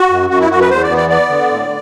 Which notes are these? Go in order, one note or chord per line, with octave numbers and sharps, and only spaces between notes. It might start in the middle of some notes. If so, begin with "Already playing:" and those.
Already playing: F#4
F#2
F#2 F#4
E4
F#2 F#4
B4
E2 C5
D5
B3
D5
B3 D5
D3
A2